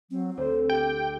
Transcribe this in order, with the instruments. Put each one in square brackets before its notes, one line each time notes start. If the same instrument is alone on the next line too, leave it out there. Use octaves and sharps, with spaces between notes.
[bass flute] F#3 [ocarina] C4
[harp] D2 [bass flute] C5
[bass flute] G4 [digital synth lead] G5